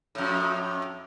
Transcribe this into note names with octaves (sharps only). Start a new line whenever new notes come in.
F2 A2